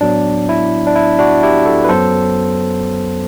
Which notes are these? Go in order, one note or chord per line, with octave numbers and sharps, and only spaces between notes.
A2 F#3 B3 D4
E4
D4
E4
D4 F#4
E4 G4
F#4 A4
B4
F#2 F#3 B3 A4 C5